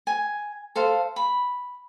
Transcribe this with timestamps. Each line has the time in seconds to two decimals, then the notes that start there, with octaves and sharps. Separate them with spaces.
0.07 G#5
0.76 A4 C5 F5
1.16 B5